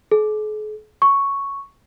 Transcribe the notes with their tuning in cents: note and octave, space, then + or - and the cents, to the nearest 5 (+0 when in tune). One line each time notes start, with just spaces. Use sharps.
G#4 +45
C#6 +0